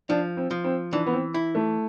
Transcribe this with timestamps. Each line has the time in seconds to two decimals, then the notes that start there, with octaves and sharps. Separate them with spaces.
0.09 F3 D4
0.37 C4
0.51 F3
0.64 C4
0.93 E3 D4
1.06 B3
1.13 C4
1.34 E4
1.55 A3